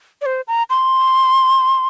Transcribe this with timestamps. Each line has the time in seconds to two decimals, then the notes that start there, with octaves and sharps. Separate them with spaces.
0.22 D5
0.26 C5
0.48 A#5
0.70 C6